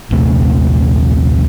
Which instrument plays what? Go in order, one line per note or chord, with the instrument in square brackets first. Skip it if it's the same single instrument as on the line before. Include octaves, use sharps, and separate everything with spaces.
[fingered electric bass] A#1 D#2 C3 A3